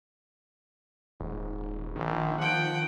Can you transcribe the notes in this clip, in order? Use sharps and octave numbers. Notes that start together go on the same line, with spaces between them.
D#1 G#2
A#1 D#3
F3 F#5 G5